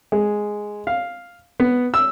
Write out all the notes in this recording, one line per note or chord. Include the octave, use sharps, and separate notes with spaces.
G#3
F5
B3
E6